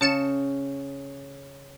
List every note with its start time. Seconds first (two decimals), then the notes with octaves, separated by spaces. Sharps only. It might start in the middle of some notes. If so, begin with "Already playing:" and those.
0.01 C#3 A5 C#7 E7